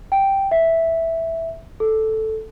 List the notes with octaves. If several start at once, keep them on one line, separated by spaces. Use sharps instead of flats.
G5
E5
A4